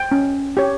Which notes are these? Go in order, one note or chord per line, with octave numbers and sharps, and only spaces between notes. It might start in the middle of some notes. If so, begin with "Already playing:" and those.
Already playing: G5
C#4
G4 C#5